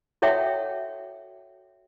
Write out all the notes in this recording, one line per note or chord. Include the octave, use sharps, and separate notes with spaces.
F#4 A4 C#5 E5 F#5 G5